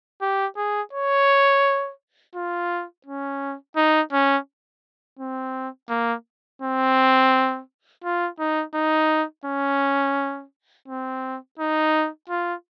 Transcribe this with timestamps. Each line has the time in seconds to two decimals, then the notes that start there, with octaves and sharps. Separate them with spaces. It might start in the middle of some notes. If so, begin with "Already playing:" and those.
0.22 G4
0.57 G#4
0.93 C#5
2.35 F4
3.06 C#4
3.76 D#4
4.12 C#4
5.19 C4
5.89 A#3
6.62 C4
8.04 F4
8.39 D#4
8.74 D#4
9.46 C#4
10.88 C4
11.59 D#4
12.29 F4